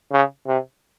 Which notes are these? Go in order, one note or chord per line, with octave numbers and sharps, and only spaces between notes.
C#3
C3